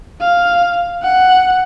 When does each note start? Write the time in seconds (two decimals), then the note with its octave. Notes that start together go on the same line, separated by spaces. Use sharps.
0.21 F5
1.03 F#5